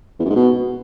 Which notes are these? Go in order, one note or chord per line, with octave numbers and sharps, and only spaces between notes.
E2
F#2
G#2
B2